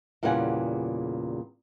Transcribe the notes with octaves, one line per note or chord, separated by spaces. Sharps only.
E2 A#2 C#3 G3 F#5 G#5